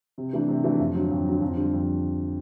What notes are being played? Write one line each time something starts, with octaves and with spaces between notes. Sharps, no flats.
C3
E3 A3 D4
C3
E3 A3 D4
F2
D3 F#3
F2
D3 F#3
F2
D3 G3
F2